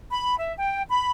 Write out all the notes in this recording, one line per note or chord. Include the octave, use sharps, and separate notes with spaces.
B5
E5
G5
B5